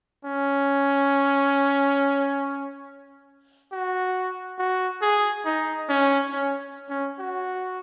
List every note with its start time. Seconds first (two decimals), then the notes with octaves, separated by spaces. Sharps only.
0.25 C#4
3.72 F#4
4.59 F#4
5.02 G#4
5.45 D#4
5.89 C#4
6.33 C#4
6.89 C#4
7.19 F#4